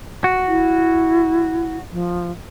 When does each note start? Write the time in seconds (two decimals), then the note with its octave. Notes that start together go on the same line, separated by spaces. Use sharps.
0.24 F#4
0.47 E4
1.90 F3